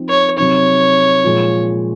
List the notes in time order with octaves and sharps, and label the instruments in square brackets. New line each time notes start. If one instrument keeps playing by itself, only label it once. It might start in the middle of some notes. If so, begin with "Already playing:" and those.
Already playing: [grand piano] F3 C4 D#4
[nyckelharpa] C#5
[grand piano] C3 F#3 C4 D#4 [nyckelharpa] C#5
[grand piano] A#2 F3 G#3